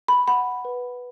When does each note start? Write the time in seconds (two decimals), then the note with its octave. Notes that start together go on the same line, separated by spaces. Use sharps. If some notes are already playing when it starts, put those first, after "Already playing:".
0.08 B5
0.28 F#5 B5
0.65 B4